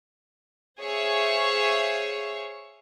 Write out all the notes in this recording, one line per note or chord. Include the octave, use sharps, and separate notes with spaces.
G#4 C5 C#5 E5 F5 C#6